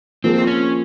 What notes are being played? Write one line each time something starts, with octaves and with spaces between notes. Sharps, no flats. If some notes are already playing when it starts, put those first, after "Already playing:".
F3 A#3 C4 F4 G#4
C#4